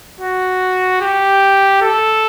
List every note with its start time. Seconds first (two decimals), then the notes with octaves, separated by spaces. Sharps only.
0.21 F#4
1.01 G4
1.82 A4